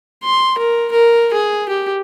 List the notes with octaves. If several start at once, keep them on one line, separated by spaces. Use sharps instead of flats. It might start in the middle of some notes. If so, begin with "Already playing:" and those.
C6
A#4
A#4
G#4
G4